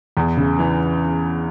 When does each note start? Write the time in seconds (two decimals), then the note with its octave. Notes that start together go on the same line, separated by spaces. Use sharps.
0.17 E2
0.37 C#3
0.59 E3